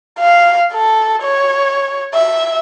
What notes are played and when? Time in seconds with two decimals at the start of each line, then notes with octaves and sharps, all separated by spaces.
0.20 F5
0.73 A4
1.22 C#5
2.14 E5